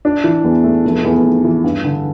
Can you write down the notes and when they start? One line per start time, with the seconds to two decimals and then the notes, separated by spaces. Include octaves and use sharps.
0.05 D4
0.24 E3
0.44 E2
0.64 A3
0.84 F1
1.04 E2
1.23 F1
1.44 E3
1.64 G2
1.84 D3